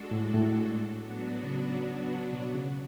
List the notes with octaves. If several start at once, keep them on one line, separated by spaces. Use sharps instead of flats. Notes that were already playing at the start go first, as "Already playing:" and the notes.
Already playing: G#3 D4 F#4 A4
A2
A2
F#3 B3 D4 F#4
C#3
B2
C#3